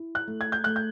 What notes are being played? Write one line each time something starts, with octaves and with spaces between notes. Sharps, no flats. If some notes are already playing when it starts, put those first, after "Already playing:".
Already playing: E4
F#6
A3
G#6
G6
A3 F#6
G6